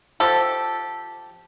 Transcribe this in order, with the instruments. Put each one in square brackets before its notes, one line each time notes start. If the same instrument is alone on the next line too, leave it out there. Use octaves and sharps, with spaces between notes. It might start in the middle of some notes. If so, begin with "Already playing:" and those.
[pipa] F3 G4 A4